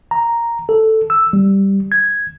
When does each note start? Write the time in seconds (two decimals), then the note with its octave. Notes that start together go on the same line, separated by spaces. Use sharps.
0.11 A#5
0.69 A4
1.10 E6
1.33 G3
1.92 G#6